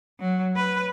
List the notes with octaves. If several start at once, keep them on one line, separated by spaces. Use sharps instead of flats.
F#3
B4